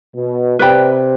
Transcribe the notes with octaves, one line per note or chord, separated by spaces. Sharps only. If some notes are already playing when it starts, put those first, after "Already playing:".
B2
C3 B4 D5 G5 B5